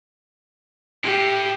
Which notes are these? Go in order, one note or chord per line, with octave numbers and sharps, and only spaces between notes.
A2 G4